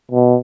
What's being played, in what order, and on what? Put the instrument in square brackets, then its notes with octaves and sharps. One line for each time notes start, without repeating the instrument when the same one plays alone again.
[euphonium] B2